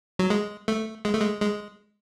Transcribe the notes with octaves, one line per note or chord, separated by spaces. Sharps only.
F#3
G#3
A3
G#3
A3
G#3
G#3